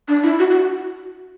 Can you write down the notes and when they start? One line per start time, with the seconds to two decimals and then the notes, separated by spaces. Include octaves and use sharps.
0.08 D4
0.24 E4
0.39 F#4
0.50 F#4